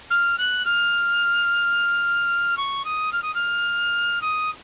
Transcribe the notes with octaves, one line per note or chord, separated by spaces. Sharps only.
F6
F#6
F6
C#6
D#6
F6
D#6
F6
D#6